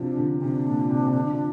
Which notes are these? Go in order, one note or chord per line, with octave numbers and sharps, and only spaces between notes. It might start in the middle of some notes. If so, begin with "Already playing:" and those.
Already playing: C3 F3 D4
D3
C3 D4
A#2
C3
C3
D3
F3